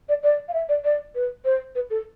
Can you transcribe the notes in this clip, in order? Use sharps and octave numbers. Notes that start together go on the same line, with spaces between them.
D5
D5
F5
E5
D5
D5
B4
C5
B4
A4